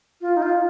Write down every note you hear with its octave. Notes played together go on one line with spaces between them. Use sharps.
F4
D#4
F4